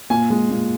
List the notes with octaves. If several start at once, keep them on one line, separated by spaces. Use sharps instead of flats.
A#2 G#5
G#3
A#2